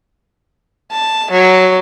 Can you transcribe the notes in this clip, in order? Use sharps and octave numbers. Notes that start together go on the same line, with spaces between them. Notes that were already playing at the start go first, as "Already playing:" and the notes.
A5
F#3